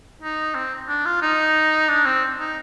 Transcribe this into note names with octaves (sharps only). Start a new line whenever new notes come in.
D#4
C4
D4
F4
D#4
D4
C4
D#4